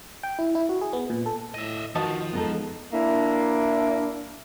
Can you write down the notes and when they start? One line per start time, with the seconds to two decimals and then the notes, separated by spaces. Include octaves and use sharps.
0.23 G5
0.39 E4
0.55 E4
0.69 F#4
0.81 G#4
0.93 B3
1.10 A#2
1.26 A4
1.54 A2 D#5 E5
1.95 D#3 F3 F#4 D#5 A5
2.33 G#3 B3 D#4 A4
2.93 A#3 D4 E4